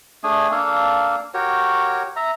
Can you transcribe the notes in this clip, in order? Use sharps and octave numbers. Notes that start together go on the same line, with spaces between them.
A3 D4 G#4 G#5
A#3 D4 A4 F5
F#4 G4 A#4 C#5
E5 A#5